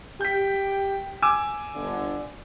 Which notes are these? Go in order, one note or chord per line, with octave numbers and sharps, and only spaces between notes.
G4 G5 G6 B6
G#5 D6 E6
G1 D3